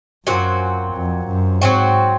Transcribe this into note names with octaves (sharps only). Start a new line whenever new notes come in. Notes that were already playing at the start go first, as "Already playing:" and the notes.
F#2 A#2 F#3 C4 F#4
F2
F#2
G#2 F#3 C4 F#4